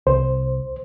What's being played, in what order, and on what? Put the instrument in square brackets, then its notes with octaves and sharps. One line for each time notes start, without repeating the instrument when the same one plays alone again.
[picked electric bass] C2 [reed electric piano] C5